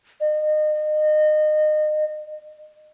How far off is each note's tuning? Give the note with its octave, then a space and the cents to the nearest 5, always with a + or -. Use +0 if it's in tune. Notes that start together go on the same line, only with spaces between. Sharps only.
D#5 -30